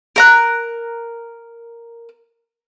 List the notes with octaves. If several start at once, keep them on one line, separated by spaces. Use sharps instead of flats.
A#4 A#5 F#6